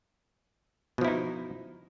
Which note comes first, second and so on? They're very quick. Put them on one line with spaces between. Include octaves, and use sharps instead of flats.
B2 F3 E4 D#4